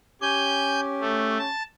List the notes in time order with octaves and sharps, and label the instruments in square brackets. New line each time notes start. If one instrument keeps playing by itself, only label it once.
[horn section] C#4 G4 [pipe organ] G#5 G6
[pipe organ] A3
A5